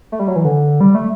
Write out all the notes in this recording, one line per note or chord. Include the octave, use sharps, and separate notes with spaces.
A3
G3
F#3
E3
D3
G3
A3